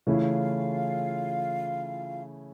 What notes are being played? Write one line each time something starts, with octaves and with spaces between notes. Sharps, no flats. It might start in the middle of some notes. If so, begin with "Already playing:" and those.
C#3 E3 A3 C#4 E4 F4 F5